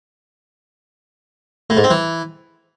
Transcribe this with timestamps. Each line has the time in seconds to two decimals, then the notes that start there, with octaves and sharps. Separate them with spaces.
1.70 A2
1.77 G#2
1.84 C4
1.90 E3